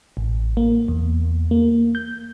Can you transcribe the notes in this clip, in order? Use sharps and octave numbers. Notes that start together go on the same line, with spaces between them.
A1
A#3
E2
A#3
G6